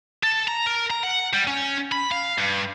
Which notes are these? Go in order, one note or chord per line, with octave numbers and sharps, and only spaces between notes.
A4
A#5
A#4
A#5
F#5
G3
C#4
B5
F5
G2